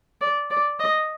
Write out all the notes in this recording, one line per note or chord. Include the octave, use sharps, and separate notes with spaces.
D5
D5
D#5